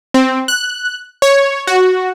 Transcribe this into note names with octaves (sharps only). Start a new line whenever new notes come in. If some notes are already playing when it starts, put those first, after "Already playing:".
C4
F#6
C#5
F#4